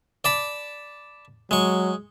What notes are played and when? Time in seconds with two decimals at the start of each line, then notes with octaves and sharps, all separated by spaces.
0.24 D5 A5 B5
1.51 F#3 G#3 C#6